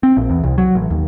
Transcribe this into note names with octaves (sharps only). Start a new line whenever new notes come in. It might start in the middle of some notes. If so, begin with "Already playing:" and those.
C4
A#1
E2
C2
F#3
A1
D#2